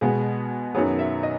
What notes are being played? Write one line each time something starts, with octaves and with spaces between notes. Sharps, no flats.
B2 G#3 B3 G#4
F#2 D#3 F#3 B3 G#4
E5
D#5